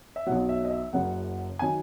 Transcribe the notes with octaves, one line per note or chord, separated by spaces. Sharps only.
E5
B1 B2 F#3 F#5
E5
D#5
E5
F#1 F#2 C#3 F#3 F#5
D#3 F#3 G#5